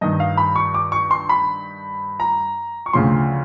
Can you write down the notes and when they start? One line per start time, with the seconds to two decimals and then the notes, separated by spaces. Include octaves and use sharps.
0.01 G2 D#3 D#5
0.20 F5
0.37 B5
0.56 C#6
0.74 D6
0.92 C#6
1.11 C6
1.29 B5
2.20 A#5
2.86 C#6
2.93 D2 C#3 F3 C6